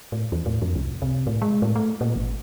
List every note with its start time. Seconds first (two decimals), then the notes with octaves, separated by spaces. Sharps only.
0.12 A2
0.32 E2
0.46 A2
0.62 F2
0.75 C2
1.02 C3
1.27 A2
1.42 G#3
1.62 A2
1.76 A3
2.01 A#2
2.16 G#1